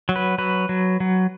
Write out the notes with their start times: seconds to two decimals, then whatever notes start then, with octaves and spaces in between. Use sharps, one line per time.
0.09 F#3
0.16 B4
0.38 F#3 B4
0.69 F#3
1.00 F#3